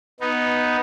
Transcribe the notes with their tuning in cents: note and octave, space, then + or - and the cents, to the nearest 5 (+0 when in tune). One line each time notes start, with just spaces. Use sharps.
B3 +0 D#4 +0